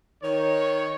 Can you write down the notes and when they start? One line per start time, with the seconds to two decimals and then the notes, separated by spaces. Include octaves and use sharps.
0.23 D#3 C#5